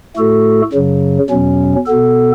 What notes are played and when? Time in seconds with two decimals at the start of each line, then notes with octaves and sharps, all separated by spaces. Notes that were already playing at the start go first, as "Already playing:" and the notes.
0.17 A2 A3 F#4 A4
0.73 F#2 C#3 F#3
1.30 E2 B2 F#3 C#4
1.86 B2 B3 A4